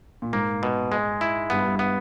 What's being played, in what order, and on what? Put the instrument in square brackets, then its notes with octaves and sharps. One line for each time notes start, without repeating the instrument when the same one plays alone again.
[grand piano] A#2
[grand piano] G#2 [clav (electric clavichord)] A#3
[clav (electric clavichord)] B2
G#3
E4
[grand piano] G2 [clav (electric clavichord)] B3
[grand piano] G2
[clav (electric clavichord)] B3